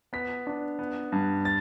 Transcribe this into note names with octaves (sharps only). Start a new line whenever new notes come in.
B3 B6
D4
B3
G2
A6